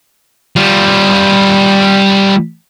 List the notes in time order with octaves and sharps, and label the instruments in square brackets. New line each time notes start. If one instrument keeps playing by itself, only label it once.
[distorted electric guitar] G3 F4